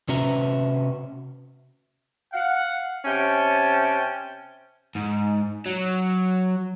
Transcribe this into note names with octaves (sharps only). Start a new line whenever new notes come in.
C3 C#4 F#4 B4 E5 A#5
F5 F#5
C3 C#4 G5 A5
G#2
F#3